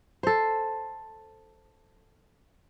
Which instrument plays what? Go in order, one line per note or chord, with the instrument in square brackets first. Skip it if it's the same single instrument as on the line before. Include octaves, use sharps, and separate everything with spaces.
[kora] A4 C5